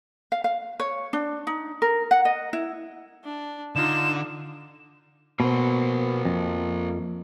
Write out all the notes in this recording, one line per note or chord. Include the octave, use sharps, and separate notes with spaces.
F5
F5
C#5
D4
D#4
A#4
F#5
D#5
E4
D4
D3 D#4 F4 E7
B2 A#3 C5
F2